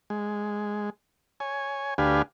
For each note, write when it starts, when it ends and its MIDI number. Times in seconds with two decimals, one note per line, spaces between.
0.10 0.90 56
1.40 1.94 73
1.40 1.94 80
1.98 2.22 38
1.98 2.22 62
1.98 2.22 67
1.98 2.22 71
1.98 2.22 77
1.98 2.22 80